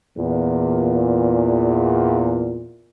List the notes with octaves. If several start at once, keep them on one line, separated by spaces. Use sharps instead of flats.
E2 A#2